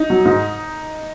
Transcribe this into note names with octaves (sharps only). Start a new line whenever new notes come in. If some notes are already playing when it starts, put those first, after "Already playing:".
Already playing: D#4
F#3
G#2